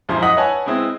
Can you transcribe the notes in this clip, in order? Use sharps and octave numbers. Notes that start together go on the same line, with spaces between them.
E1 F#2 F3 E4 A#5 C6
D#5 F#5 D#6 A#6 B6 F#7
B4 C#5 E5 F#5 G#5 A5
G#3 B3 C4 E4